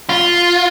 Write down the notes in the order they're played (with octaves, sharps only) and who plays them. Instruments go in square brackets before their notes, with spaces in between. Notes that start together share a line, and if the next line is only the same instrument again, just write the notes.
[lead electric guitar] F4